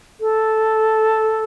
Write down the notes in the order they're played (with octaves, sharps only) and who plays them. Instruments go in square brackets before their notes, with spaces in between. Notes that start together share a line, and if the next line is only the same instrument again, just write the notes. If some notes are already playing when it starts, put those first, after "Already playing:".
[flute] A4